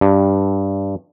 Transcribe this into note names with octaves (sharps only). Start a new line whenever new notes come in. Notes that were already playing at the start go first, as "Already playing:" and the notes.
G2